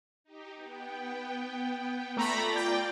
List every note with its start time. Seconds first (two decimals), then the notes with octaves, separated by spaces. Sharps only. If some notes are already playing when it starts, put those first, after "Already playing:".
0.24 D#4 G4
0.55 B3 G5
2.17 A3 F4 D5 A#5 B5 D6
2.56 G5